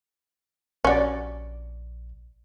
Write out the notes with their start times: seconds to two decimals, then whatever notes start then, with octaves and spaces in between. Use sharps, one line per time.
0.84 A#1 C#4 F#4 D5 C#6